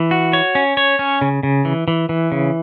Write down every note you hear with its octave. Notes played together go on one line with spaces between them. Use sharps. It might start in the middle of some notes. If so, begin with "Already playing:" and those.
Already playing: E3
F#4
C#5
C#4
C#5
C#4
C#3
C#3
E3
E3
E3
C#3